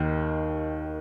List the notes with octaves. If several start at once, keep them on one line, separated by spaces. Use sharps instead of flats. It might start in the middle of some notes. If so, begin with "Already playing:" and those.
Already playing: D#2 D#3